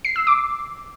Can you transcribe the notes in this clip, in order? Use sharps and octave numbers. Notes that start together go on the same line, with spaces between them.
C7
E6
D6